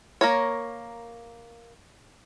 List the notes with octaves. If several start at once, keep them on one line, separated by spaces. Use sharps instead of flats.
A#3 A#4 C#5